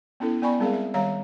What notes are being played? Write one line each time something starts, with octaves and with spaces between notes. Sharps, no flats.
B3 C#4 E4 A4
B3 D5 G#5 B5 C#6
G3 G#3 C4 G#4 A#4 F5
E5
D#3 G3 C#5 F5 A#5